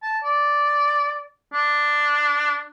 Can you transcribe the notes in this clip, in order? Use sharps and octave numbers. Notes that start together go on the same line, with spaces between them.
A5
D5
D4